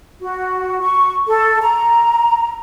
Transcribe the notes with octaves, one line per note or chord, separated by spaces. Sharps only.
F#4
C#6
A4
A#5